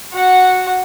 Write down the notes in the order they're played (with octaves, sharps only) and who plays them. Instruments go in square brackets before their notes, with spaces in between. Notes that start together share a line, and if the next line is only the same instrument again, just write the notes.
[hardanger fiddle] F#4 F#5